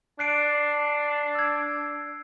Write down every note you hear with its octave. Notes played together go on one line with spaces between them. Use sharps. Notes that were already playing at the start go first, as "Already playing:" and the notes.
D4 F#6 C7 D7
E6 G#6